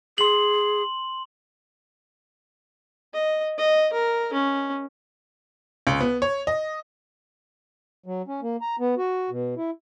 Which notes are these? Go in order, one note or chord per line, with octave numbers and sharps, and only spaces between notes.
G#4 C6 F#7
D#5
D#5
A#4
C#4
C#2
B3
C#5
D#5
F#3
C#4
A#3
A#5
B3
F#4
B2
E4